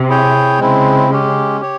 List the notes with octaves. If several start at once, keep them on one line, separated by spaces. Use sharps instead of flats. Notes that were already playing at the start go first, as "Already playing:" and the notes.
Already playing: C3
E4 G#4 C#5 G5
C#3 G#3 C4 E4
G#3 C#4 G4
G4 C#5